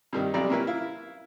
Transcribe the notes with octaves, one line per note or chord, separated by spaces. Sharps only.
G2 C3 D#3 G3
B1 C3 G3 D5 A#5
C3 A#3 C#4 E4 A#4 B4
E4 F5